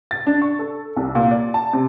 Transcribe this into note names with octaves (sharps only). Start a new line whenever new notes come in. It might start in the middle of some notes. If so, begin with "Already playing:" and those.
A6
D4
C#6
A4
C2
A#2
D5
A5
C3